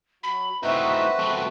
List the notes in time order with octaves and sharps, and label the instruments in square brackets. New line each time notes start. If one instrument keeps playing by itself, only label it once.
[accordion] F#3 [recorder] B5
[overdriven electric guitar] A2 D#4 [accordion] C4 F#4 B4 [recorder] E5
[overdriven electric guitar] A3 B3